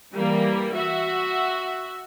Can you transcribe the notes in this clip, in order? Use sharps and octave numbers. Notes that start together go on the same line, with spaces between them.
E3 G3 A#3
F#4 E5